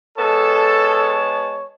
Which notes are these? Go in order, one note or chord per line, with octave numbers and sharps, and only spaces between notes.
G#3 B3 A4 C#5 A5